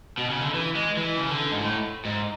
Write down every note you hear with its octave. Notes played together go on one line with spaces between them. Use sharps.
B2
C#3
D3
E3
G#3
E3
C#3
D3
G#2
A2
G#2